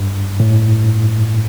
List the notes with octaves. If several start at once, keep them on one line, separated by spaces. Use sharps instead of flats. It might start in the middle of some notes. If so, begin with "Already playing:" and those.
Already playing: G2
A2